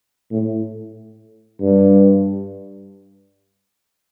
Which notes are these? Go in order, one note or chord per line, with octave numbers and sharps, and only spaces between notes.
A2
G2